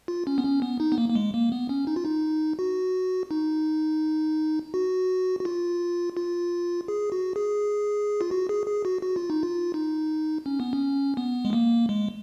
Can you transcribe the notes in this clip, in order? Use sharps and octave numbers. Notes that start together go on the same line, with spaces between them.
F4
C#4
B3
C#4
B3
D#4
B3
A#3
A#3
G#3
A#3
B3
C#4
D#4
F4
D#4
F#4
D#4
F#4
F#4
F4
F4
G#4
F#4
G#4
F4
F#4
G#4
G#4
F#4
F#4
F4
D#4
F4
D#4
C#4
B3
C#4
B3
G#3
A#3
G#3